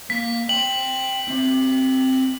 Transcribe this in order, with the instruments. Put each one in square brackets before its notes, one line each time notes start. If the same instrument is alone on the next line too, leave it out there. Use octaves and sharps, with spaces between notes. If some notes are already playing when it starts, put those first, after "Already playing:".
[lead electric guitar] A#3 [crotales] B6
[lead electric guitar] G5 C6 [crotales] F#7
[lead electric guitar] C4 E5